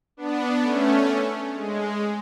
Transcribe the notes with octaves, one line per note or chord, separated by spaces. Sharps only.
B3 D4
A3 C#4
G#3